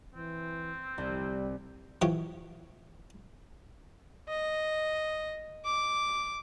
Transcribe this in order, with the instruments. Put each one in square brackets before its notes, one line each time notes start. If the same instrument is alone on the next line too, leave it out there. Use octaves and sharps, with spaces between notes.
[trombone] E3 [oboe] C4
[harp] C2 [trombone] G3
[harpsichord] E3 F3 G4 C#5
[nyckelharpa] D#5
D6